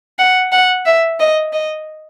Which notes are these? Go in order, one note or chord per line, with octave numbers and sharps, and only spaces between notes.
F#5
F#5
E5
D#5
D#5